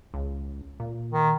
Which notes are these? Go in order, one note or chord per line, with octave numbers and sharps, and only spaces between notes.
C#2
A#2
D#3